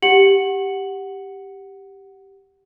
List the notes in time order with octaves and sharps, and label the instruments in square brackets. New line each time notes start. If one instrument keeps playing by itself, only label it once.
[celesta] G4 F#5 C#7 F#7